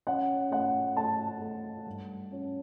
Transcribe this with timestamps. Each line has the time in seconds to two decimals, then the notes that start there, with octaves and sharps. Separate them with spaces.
0.07 C#4 F#5
0.51 A3 F#5
0.96 A3 A5
1.41 A3
1.86 G2
2.32 C#4